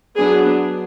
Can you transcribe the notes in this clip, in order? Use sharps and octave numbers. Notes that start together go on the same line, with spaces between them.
F#3 B3 D4 G#4